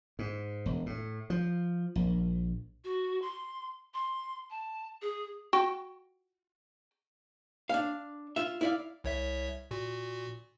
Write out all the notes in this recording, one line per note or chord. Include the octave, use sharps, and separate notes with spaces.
G#2
E1
A2
F3
A#1
F#4
C6
C6
A5
G#4
F#4 G5
D4 F5
F4 E5
E4 D5 F5
C2 C#5 E5
A#2 F#4